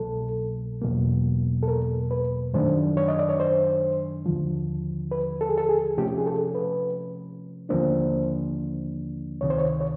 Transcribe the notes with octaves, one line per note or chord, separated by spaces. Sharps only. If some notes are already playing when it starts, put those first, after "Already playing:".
Already playing: C2 B2 F#3 A#3 A4
E2 B2 F#3 A#3
A4
A#4
B4
F#2 D#3 F#3 A3 D4 C5
C#5
D#5
D5
C#5
C5
D#2 D3 F3
B4
A4
G#4
A4
G#4
C3 F3 A3 C#4 G4
G#4
A4
B4
D#2 D3 F3 A#3 D4 C5
C#2 C3 D#3 C#5
C5
C#5
C#5